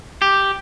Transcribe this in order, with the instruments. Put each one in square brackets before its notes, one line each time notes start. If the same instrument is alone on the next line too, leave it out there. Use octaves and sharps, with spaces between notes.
[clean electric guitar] G4